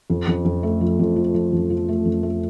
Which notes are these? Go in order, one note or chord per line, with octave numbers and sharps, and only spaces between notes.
F2
F2
F2
A3
F3
F2
F3
F3
F2
F3
A3
F2
A3